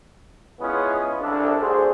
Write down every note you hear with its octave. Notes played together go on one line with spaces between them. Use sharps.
G#3 B3 C#4 E4 F4 G#4
C2 D4 A4
A3 D4 F#4 G#4 C5